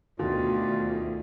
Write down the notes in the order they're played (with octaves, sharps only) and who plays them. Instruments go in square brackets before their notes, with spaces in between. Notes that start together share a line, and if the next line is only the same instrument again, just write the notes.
[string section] D2 [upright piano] B2 [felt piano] D#3 [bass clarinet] F4